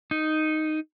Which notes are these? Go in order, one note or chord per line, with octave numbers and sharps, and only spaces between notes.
D#4